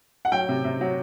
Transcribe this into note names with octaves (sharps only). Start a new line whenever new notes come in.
F#5
F#3 G5
C3
C3
F#3